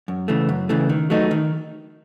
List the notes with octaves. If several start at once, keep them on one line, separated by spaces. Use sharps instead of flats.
F#2
C#3 E3 A3
F#2
C#3 E3 A3
D#3
F#3 A3 D#4
D#3